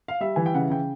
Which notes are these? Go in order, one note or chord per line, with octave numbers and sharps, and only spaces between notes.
F5
G3 E5
E3 G#5
G5
C#3 F#5
C#3 G5